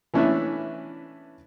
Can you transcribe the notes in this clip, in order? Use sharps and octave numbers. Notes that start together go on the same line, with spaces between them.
E3 A3 C#4 D4 B4 E5